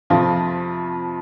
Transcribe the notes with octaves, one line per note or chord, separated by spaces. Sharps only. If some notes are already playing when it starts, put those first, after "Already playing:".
F2 C3 F3 F4